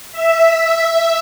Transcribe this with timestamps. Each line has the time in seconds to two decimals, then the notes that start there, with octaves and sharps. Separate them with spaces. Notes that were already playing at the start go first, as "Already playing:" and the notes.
0.12 E5